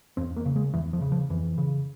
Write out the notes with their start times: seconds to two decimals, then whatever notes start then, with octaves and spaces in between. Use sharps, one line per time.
0.17 E2 C4
0.36 A#3
0.45 C#3
0.56 G#3
0.74 E2 E3
0.93 F3
1.01 C#3
1.12 F3
1.30 F2 E3
1.58 C#3